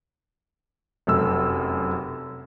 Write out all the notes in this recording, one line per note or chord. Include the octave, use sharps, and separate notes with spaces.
F1 F#2 E6